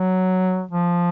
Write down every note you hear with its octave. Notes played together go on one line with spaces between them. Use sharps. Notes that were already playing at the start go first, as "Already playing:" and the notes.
Already playing: F#3
F3